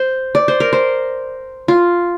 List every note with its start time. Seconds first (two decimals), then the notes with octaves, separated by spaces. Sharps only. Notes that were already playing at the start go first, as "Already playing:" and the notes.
Already playing: C5
0.35 D5
0.48 C5
0.60 A#4
0.73 C5
1.68 F4